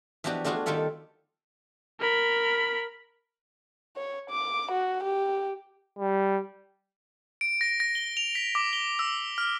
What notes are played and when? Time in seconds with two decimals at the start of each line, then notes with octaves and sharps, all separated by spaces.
0.24 E3 F3 B3 D4 F#4 G4
0.44 A3 D4 F4 F#4 G#4
0.66 D#3 G3 F4 A4 B5
2.00 A#4 B5
3.96 C#5
4.30 D6
4.72 F#4
5.04 G4
5.99 G3
7.41 D7
7.61 A#6
7.80 A#6
7.95 G7
8.17 F7
8.35 B6
8.55 D6
8.73 G7
8.99 E6
9.38 F6